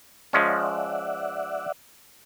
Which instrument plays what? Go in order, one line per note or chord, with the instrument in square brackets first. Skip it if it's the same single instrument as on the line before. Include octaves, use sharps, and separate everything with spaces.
[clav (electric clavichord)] F3 G#3 C#4 [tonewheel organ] D5 E5 F#5